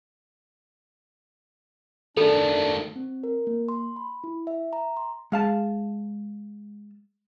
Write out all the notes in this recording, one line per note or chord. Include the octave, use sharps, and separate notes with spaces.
D#3 A3 D4 A4
C4
A#4
A#3
C6
B5
E4
E5
A#5
C6
G#3 F5 A5